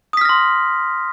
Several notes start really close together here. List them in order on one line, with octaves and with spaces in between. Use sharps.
D#6 B6 F6 A#6 C6